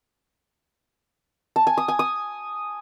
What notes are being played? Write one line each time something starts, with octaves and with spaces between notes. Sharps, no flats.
A5
G#5
D#6
G#5
D#6